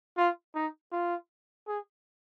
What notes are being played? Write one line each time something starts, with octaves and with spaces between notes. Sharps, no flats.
F4
D#4
F4
G#4